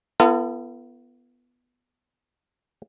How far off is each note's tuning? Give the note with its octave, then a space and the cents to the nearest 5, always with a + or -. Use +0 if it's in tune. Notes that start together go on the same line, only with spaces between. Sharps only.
B3 +0 F4 -45 A4 +40